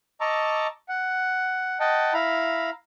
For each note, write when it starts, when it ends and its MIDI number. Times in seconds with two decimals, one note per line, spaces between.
0.21 0.67 75
0.21 0.67 81
0.21 0.67 82
0.21 0.67 85
0.21 0.67 86
0.21 0.67 88
0.89 1.79 78
1.80 2.13 75
1.80 2.13 78
1.80 2.13 79
1.80 2.13 81
2.13 2.70 64
2.13 2.70 77
2.13 2.70 82
2.13 2.70 83